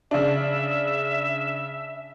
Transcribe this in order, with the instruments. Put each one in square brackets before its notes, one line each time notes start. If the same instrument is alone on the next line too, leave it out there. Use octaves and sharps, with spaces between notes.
[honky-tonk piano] C#3 D4 [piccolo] E5